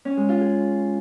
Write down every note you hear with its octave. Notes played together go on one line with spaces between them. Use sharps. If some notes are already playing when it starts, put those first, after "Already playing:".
C#4
G#3
F4
G#4